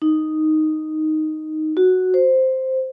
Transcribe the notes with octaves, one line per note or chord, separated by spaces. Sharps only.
D#4
F#4
C5